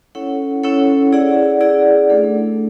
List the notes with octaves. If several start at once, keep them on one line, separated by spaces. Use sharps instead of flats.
C#4 E4 A4 C#5 F#5
C#4 E4 A4 C#5 F#5
E4 G#4 D5 F#5
E4 G#4 D5 F#5
A3 D4 A4